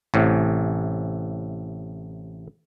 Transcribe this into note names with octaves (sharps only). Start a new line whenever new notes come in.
A1 A2 C3